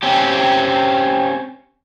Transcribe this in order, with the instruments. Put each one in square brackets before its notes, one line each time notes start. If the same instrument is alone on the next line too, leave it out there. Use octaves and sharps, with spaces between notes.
[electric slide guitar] C4 C#4 G4